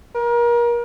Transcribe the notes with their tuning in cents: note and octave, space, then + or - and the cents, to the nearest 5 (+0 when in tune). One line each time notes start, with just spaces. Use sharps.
A#4 +30